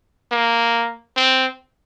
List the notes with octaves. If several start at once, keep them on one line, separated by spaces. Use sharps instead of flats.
A#3
C4